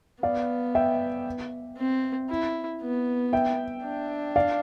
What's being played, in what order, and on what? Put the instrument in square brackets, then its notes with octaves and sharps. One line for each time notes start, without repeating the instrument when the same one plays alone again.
[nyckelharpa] B3 [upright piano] D5 F5
[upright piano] E5 G5
[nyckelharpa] C4
E4
B3
[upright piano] E5 G5
[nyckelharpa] D4
[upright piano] D5 F5